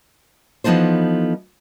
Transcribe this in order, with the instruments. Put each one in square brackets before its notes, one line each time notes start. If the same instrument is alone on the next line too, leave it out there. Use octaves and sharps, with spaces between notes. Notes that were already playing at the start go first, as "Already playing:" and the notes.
[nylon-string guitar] E3 F3 B3 D#4 A4 C5